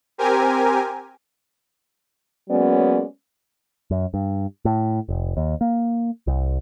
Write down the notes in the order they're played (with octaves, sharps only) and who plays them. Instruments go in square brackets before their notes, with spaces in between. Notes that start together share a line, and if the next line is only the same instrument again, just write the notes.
[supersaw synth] C4 G4 A#4 G#5
[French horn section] F#3 G#3 A#3 B3 C#4 D5
[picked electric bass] F#2
G2
A2
F1
D#2
A#3
C2